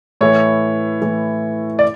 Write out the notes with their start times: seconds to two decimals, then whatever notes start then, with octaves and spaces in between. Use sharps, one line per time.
0.21 A2 E3 C#5
1.02 A2 E3
1.79 D5